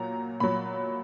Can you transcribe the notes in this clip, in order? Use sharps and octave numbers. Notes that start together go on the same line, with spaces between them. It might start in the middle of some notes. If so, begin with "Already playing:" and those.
Already playing: A#2 F#3 A#5
A#2 F#3 B5